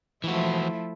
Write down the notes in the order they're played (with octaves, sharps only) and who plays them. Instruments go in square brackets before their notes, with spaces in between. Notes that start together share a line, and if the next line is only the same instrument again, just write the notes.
[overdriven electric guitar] E3 F#4 [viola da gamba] F3 A3 E4